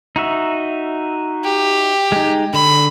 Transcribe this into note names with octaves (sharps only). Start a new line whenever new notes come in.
D#4 F#4 E5
G4
G#3 D#4
D3 B5